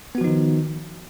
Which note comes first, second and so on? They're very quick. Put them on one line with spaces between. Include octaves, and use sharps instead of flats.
B3 F#4 F3 D#4 D#3